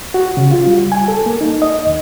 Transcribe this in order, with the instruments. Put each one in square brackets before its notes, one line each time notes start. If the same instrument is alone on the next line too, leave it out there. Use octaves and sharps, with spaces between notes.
[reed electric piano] F#4
C#3
F4
G3
G#5
A4
A#3
D#4
D#5
D#2